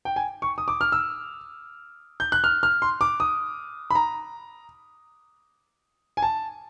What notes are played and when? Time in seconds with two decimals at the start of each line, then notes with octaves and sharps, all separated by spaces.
0.05 G5
0.16 G#5
0.42 C#6
0.58 D#6
0.68 D6
0.81 F6
0.92 E6
2.20 G6
2.32 F#6
2.44 F6
2.63 F6
2.82 C6
3.01 D6
3.20 D#6
3.91 B5
3.95 A#5
6.17 G#5
6.22 A5